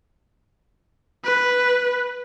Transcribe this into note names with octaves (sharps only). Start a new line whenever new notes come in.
B4